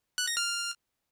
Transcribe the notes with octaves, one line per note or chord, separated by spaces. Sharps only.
F#6
A#6
F6